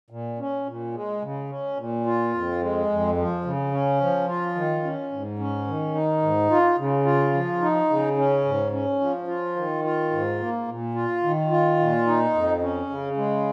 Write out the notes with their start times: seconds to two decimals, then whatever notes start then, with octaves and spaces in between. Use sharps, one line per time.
0.10 A#2
0.39 C#4
0.66 A#2
0.94 G#3
1.22 C#3
1.50 C#4
1.77 A#2
2.06 F4
2.34 F2
2.61 G#3
2.89 F2
3.17 F3
3.45 C#3
3.72 C#4
4.01 F3
4.28 F4
4.55 D#3
4.84 C#4
5.12 G#2
5.39 C#4
5.67 D#3
5.95 D#4
6.22 G#2
6.51 F4
6.79 C#3
7.05 F4
7.34 F3
7.62 D#4
7.90 C#3
8.17 C#4
8.45 G#2
8.72 C#4
9.00 F3
9.28 F4
9.56 D#3
9.84 F4
10.11 G#2
10.40 A#3
10.68 A#2
10.94 F4
11.23 D#3
11.51 F4
11.79 A#2
12.07 D#4
12.34 F2
12.62 C#4
12.90 C#3
13.17 G#3